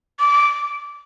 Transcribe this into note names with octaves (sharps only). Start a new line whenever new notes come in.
D6